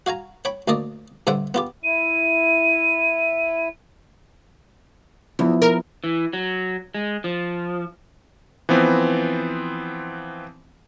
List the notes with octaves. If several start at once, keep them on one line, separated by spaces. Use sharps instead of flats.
F#4 F5 G#5 A#5
C#5 G5 B5
D2 A#3 D5 D#5
G2 D3 C5 E5 F#5 G5
B3 F4 G4
E4 D#7
E2 F3 B3 E4
A#4
E3
F#3
G#3
F3
E3 F3 B3 C4